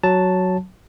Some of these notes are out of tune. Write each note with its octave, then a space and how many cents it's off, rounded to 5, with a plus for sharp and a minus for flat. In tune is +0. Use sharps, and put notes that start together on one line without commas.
F#3 +0 A5 +0